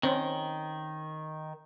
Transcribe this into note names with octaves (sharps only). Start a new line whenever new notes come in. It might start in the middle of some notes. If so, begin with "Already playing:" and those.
D#3 C4 C#4